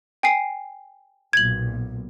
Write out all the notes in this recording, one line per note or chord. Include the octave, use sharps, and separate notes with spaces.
G5 G#5 C7
B1 A#2 G#6 F#7